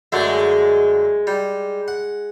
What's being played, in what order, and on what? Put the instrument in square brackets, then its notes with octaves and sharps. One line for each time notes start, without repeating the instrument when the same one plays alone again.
[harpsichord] F#2 D3 A3 [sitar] G#3
[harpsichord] G3
F#5